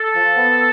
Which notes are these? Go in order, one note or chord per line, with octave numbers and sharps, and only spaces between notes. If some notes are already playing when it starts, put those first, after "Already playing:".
Already playing: A4
F3
B3